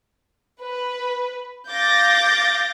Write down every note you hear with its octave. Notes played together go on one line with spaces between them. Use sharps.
B4
F5 D6 G6 A6 A#6